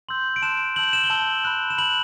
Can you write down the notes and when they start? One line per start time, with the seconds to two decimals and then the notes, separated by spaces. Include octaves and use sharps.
0.09 C6 E6 G6 F#7
0.36 D7
0.42 A5 C6 F#6 E7
0.76 A5 E6 G6 F#7
0.93 E7
1.04 G7
1.10 A5 E6 G6 F#7
1.45 B5 F#6
1.70 E7
1.78 B5 F#7
1.82 F#6